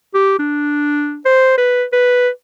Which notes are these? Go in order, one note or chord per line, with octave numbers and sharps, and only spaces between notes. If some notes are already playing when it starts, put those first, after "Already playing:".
G4
D4
C5
B4
B4